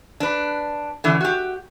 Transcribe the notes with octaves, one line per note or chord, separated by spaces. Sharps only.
D4 B4
D3 E3 C#4
F#4 G4